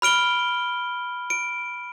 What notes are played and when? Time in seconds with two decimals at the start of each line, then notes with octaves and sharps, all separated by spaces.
0.02 B5 F6 D7 G7
1.30 D7